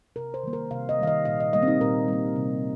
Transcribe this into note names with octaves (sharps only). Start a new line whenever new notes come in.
C3 A#4
C5
D#3 G3 A#3
A#4
C3 F5
D#5
D#3 G3 A#3 F5
D#5
A#2 F5
D#5
G3 A#3 D#5
C4
D#4
A#2 A#4
G3 A#3
C3